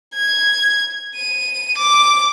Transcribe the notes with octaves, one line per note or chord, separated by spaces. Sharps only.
G#6
D#7
D6